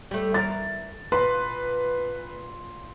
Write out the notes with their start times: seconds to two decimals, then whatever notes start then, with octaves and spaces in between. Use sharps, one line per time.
0.11 G3 A3
0.34 E3 A#4 A6
1.12 A#2 B4 C6